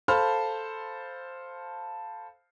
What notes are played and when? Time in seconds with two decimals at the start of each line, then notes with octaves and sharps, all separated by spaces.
0.08 A4 C5 F5 A5 B5 F6